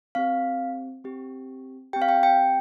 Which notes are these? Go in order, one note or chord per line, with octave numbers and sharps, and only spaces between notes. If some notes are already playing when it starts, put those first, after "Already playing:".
C4 G4 F5
C4 G4
C4 G4 G5
F5
G5
G5